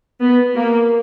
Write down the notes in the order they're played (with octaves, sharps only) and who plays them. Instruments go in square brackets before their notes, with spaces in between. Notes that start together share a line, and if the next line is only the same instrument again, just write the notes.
[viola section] B3
A#3